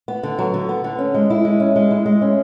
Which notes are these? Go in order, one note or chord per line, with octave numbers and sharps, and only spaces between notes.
B3
D3
F#3
D3
B3
D3
C#4
G#3
E4
G#3
C#4
G#3
E4
G#3
C#4